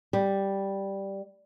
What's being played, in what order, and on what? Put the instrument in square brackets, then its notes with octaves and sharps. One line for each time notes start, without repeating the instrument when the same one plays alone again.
[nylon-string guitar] G3